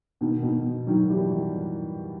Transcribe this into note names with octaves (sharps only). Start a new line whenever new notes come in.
B2 D#3
B2 D#3
D#3 F#3
E3 G3